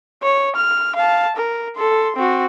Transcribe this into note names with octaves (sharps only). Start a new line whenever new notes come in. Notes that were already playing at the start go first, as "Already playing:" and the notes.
C#5
F6
F5 A5
A#4
A4 C6
C4 F#4